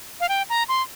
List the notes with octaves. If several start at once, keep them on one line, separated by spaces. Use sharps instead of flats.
F5
G5
A#5
C6